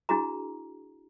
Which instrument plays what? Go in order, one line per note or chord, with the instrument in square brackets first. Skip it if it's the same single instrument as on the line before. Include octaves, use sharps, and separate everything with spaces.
[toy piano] D4 E4 F#4 G#4 A#5